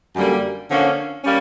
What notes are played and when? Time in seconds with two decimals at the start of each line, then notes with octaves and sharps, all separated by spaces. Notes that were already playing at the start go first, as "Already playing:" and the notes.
0.16 F#2 D3 G3 A#3
0.70 D3 F3 A#3 C#4
1.24 G3 A#3 C#4